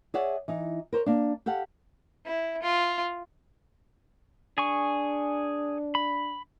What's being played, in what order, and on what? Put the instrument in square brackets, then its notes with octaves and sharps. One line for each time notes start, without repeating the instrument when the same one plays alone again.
[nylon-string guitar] G#4 C#5 D5 E5 F#5
E3 D#4
A#4 C5 C#5
A#3 D4
G4 A4 F5 F#5
[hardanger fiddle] E4
F4
[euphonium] D4 [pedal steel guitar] G#4 G#5 C#6
[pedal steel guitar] B5